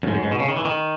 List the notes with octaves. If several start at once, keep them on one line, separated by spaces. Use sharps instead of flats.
F#2
G#2
F#2
G#2
B2
C#3
D#3
E3
D#3